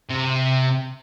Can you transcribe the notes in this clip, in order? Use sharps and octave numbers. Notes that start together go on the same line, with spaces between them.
C3